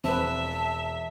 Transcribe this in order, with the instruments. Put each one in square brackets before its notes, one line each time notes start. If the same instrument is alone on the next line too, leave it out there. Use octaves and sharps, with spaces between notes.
[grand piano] E1 [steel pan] C4 B4 [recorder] E5 [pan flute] A5